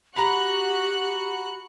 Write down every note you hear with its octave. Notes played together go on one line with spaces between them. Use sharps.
F#4 G4 A#5 B5 F#6 C#7